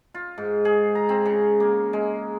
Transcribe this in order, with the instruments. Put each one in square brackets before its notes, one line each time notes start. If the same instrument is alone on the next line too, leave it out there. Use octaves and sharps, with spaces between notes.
[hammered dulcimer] F4
G#2
G#4
A#5
C4
C#3
A#3
G#3